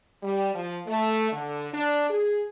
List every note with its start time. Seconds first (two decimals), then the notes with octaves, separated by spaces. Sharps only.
0.23 G3
0.55 F3
0.87 A3
1.32 D3
1.74 D4
2.10 G#4